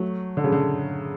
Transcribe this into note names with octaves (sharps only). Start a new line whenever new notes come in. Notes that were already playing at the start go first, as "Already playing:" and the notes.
Already playing: F#3 A3
D3
C#3
D3